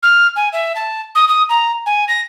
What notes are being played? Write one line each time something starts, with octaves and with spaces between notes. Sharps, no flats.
F6
G#5
E5
A5
D#6
D#6
A#5
G#5
A#6